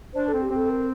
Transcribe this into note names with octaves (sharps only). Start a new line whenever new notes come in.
D4 C5
A4
C4
G4
C4
A4
A#4